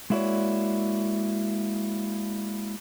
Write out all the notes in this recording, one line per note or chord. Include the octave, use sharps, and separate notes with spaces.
G#3 A#3 E4 F#4 C#5 D5